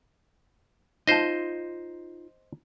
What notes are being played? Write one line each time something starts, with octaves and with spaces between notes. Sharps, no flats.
D#4 F4 C5 D#5 A5